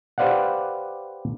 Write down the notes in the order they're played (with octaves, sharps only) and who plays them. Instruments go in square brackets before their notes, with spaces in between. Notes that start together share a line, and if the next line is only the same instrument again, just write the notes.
[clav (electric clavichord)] G4 B4 C5 D5 F5 F#5